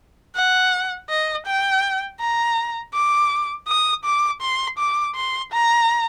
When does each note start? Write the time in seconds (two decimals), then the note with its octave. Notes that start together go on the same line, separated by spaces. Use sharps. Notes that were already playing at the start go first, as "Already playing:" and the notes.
0.36 F#5
1.10 D#5
1.47 G5
2.21 A#5
2.95 D6
3.68 D#6
4.05 D6
4.42 C6
4.79 D6
5.16 C6
5.53 A#5